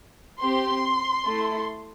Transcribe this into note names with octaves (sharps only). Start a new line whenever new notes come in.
C4 G4 C6
A3 E4 A4